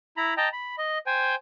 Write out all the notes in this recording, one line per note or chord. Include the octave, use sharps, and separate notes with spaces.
E4 A#5 B5
D#5 G5 A5 A#5
B5
D#5
C5 G5 G#5